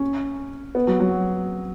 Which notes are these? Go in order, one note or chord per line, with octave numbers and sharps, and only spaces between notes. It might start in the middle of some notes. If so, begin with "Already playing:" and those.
Already playing: C#4
B3
F#3
F#3